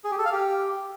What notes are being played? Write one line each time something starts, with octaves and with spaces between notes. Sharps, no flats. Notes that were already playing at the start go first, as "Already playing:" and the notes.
G#4
G4
A4
F5
G4